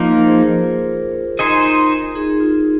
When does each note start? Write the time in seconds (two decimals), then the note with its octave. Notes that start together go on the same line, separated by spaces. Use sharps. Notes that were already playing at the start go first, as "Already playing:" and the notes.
Already playing: F3 A#3 D#4 F4 A#4
0.15 A#4
0.26 G#4 C5
0.64 F4 A#4
1.39 D#4 G#4 C5 D#5
2.15 D#4 G#4
2.40 F4